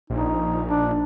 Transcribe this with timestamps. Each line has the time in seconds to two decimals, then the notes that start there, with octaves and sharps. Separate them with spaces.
0.10 A#1 D#4
0.68 D4